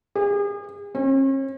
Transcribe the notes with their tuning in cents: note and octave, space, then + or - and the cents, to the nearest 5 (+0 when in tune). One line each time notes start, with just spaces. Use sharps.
G#4 -40
C#4 -45